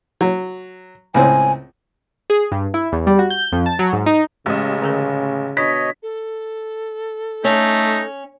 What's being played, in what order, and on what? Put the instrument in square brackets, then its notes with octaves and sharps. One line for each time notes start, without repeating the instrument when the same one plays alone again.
[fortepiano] F#3
[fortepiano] C#2 A2 C4 [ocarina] G#5
[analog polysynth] G#4
G2
E4
E2
G3
F#4
G6
F2
A5
F#3
G#2
D#4
[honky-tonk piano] A1 D#5 [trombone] C#3 [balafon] G#3 G4
[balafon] D3 G#4 A#4
[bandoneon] B2 C#5 D#5 [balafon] D4 [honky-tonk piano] B6
[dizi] A4
[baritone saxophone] A3 [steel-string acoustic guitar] C#4 [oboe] D#4